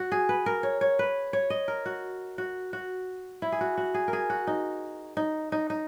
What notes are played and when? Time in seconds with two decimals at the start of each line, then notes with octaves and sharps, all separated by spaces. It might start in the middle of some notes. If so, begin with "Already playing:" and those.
Already playing: F#4
0.12 G#4
0.29 B4
0.46 A#4
0.63 C#5
0.81 C#5
0.99 B4
1.33 C#5
1.50 D#5
1.68 A#4
1.86 F#4
2.38 F#4
2.73 F#4
3.42 E4
3.52 G#4
3.61 F#4
3.77 F#4
3.94 G#4
4.08 A#4
4.13 G#4
4.30 F#4
4.47 D#4
5.17 D#4
5.52 D#4
5.70 D#4